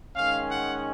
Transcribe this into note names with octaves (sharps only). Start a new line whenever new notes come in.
D#3 G#3 C#4 F5
F#5